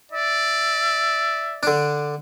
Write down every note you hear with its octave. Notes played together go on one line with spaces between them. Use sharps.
D5 E5
D3 D4